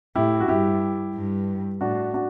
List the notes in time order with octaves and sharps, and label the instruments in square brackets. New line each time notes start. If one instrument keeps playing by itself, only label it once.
[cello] A2 [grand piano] E4 G4
[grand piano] F#4
[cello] G2 [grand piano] E4 G4
[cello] G2
[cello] A2 [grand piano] D4 F#4
[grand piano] D4 F#4